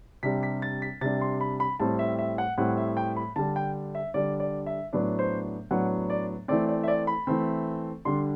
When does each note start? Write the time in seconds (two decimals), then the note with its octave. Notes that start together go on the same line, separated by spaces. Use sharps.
0.23 C3 G3 D4 B6
0.43 B6
0.62 A6
0.82 B6
1.01 C3 G3 D4 A6
1.21 C6
1.41 B5
1.60 B5
1.80 A2 G3 C4 A5
1.99 E5
2.19 E5
2.38 F#5
2.58 A2 G3 C4 F#5
2.77 E5
2.97 G5
3.17 B5
3.36 D3 G3 D4 A5
3.56 G5
3.95 E5
4.14 D3 G3 D4 D5
4.40 D5
4.66 E5
4.93 A2 F#3 B3 D4 D5
5.19 C5
5.71 A2 F#3 B3 D4 F#5
6.10 D5
6.48 E3 A3 C4 D5
6.68 D5
6.83 E5
6.88 D5
7.07 B5
7.27 E3 A3 C4
8.05 D3 G3 D4 C6